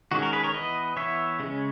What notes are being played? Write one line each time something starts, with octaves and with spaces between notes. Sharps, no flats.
D#3 G#3 C#4 F#4
F#4 A#4
G#4 B4
A#4 C#5
E3 B3 B4 D#5
E3 B3 C#5 E5
C#3 G#3 C#4